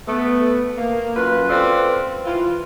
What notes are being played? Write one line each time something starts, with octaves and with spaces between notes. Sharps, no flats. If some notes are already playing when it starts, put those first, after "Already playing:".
A3 B3
A#3
F#2 F4 B4
C4 F4 A4 B4 D5
E3 F4